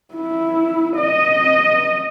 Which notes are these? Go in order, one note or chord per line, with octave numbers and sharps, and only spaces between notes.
E4
D#5